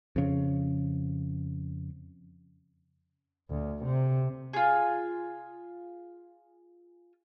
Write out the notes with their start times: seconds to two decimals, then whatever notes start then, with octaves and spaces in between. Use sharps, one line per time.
0.16 F2 C#3
3.50 D2
3.85 C3
4.53 F4 G#4